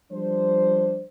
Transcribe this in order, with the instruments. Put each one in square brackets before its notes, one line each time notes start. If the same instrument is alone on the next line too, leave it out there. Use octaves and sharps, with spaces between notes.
[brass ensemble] F3 G3 D4 C5